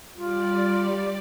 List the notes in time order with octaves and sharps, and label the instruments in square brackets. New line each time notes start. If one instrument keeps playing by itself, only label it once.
[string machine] G3 D5 [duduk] F4